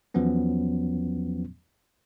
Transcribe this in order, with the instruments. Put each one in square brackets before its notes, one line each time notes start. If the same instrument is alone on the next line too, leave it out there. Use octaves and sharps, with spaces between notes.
[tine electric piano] E2 F3 F#3 B3 C#4